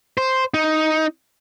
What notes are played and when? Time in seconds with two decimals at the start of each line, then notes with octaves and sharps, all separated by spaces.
0.18 C5
0.54 D#4